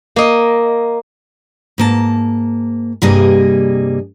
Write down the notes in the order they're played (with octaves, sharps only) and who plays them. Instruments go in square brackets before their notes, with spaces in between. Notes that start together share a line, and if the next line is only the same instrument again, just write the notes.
[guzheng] A#3 D#5
[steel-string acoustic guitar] G#2 A#3 A5
G2 C3 G3 A#3 G#4 D#5